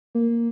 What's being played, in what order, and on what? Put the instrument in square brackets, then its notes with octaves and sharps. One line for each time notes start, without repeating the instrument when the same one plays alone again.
[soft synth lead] A#3